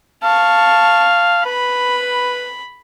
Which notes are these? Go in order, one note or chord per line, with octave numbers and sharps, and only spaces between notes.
F5 A5 C#6
B4 B5